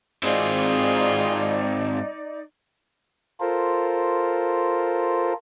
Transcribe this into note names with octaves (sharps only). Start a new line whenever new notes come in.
G#2 C4 D#4 F4 G#4 D5
F4 A4 A#4 C5